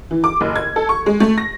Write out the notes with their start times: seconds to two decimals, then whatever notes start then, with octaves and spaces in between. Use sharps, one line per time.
0.11 E3
0.24 D6
0.41 F#1
0.56 G#6
0.76 A4
0.89 C#6
1.06 G#3
1.20 A3
1.38 A#6